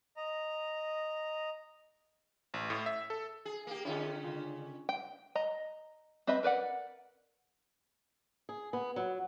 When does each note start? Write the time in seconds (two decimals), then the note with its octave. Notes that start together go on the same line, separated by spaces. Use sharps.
0.17 D#5 A#5
2.54 A1
2.70 A2
2.86 E5
3.10 A4
3.45 G#4
3.67 A#3 G4
3.85 D3 C#4 E4 F4 G#4
4.23 C#3 F4
4.89 G5
5.35 D#5 A#5
6.27 C4 B4 D#5 E5 B5
6.43 A#4 B4 D5 F#5
8.49 G#4
8.73 B3
8.96 F#3